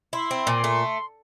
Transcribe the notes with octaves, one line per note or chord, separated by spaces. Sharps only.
E4 C6
C4
A#2
A3